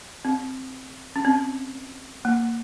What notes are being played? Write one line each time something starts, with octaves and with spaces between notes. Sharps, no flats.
C4
C#4
C4
A#3